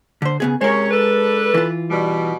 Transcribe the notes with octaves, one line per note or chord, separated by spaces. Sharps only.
D3 C5
C#3 B3 G#4
C3 G#3 C#4 A#4 C#5
D4 A4 B4
E3 F4
B2 G3